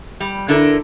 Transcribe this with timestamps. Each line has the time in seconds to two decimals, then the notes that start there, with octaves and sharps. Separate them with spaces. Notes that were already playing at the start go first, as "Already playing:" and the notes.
0.20 G3
0.48 D3 D4 E4 A4 A#4